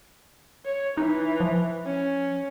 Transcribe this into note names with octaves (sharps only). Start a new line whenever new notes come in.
C#5
E3 D#4
F3
C#4